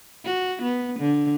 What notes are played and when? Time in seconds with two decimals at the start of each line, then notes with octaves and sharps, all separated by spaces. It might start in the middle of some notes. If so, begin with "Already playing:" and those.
0.24 F#4
0.62 B3
0.99 D3